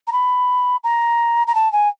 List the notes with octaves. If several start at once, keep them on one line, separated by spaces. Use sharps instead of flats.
A#5
B5
A#5
A#5
A5
G#5